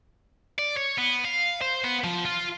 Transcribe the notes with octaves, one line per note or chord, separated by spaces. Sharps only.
D5
C#5
B3
F5
C5
B3
F3
F4